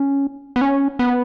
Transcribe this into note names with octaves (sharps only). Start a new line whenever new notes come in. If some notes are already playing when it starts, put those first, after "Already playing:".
Already playing: C#4
B3
C#4
B3